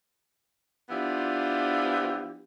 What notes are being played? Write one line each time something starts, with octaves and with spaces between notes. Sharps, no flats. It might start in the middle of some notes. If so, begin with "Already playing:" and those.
F3 B3 D4 E4 F4 G4